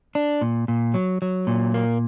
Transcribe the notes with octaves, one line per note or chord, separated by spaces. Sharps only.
D4
A#2
A#2
F#3
F#3
A#2
A#3